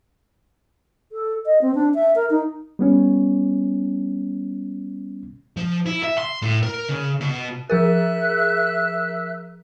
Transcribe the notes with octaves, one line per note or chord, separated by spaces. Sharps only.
A4
D#5
C4
D4
E5
A#4
D#4
G3 B3 C#4
F3
E4
E5
C6
A2
A#4
C#3
B2
F3 G#4 A#4 E5 E6 F#6